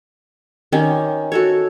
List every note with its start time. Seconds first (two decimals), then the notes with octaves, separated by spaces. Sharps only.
0.72 D#3 C#4 G4
1.32 F#4 A4 C#5